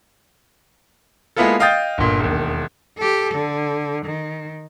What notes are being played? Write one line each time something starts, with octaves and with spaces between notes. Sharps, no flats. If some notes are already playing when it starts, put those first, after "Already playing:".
G#3 A#3 B3 E4 F4 A4
D#5 F5 G5 D#6 G6 A6
G1 A#2
E1 D#2
G4 A4
D3
D#3